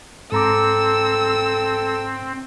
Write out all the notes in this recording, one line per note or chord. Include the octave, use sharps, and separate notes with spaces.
G#2 C4 A4 A#5 D6 E6